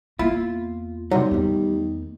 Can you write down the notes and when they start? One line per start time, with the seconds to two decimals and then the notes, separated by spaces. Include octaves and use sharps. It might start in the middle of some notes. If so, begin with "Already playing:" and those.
0.19 E2 A#3 E4 F4
1.11 C3 D#3 F#3 G3
1.31 E2 A3